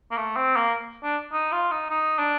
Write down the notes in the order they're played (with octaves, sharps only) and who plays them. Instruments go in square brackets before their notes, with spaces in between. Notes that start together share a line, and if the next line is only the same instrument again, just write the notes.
[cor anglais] A#3
A3
C4
A#3
D4
D#4
F4
D#4
D#4
D4